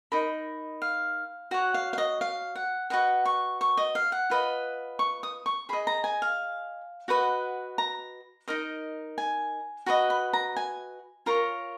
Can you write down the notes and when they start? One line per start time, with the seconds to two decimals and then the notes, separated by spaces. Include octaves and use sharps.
0.12 D#4 A#4 D#5 B5
0.82 F5
1.51 F#4 C#5 F#5
1.74 F5
1.93 F5
1.98 D#5
2.21 F5
2.55 F#5
2.90 F#4 B4 D#5 F#5
3.26 C#6
3.61 C#6
3.77 D#5
3.95 F5
4.12 F#5
4.30 F4 B4 D#5
4.99 C#6
5.23 D#6
5.46 C#6
5.69 G#4 D#5 B5
5.87 A#5
6.04 G#5
6.22 F5
7.08 F#4 B4 D#5 F#5
7.78 A#5
8.48 D#4 A#4 D#5
9.18 G#5
9.86 F#4 B4 D#5 A#5
10.10 B5
10.33 A#5
10.56 G#5
11.26 F4 A#4 C#5 A#5